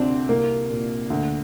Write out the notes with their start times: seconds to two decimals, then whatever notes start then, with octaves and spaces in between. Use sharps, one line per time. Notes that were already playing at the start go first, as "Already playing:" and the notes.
Already playing: D2 C3 C4 D4
0.28 C2 A#3
0.70 A#2
1.10 D2